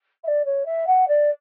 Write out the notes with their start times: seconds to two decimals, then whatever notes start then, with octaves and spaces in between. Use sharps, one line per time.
0.24 E5
0.27 D5
0.45 C#5
0.65 E5
0.87 F#5
1.08 D5